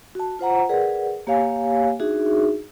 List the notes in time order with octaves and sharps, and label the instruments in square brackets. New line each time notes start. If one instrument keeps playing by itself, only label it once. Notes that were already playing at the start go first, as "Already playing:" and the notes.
[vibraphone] F#4 A5
F4 C5 F#5 A#5
G#4 A#4 B4 D5 F#5
A#3 G4 C#5 F5 G#5
D4 D#4 F#4 G#4 E5